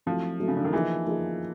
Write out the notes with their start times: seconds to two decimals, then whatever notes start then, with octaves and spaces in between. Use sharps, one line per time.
0.06 F3 F#3 A3 C4 E4
0.40 F#3 A3 C4 E4
0.48 C#3
0.57 D3
0.65 D#3
0.73 E3 F3 A#3 D#4 G#4
1.06 F3 A#3 D#4 G#4